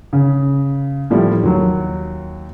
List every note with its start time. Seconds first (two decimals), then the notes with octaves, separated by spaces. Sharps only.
0.13 C#3
1.10 A2 F3 G3
1.43 D#2 F#3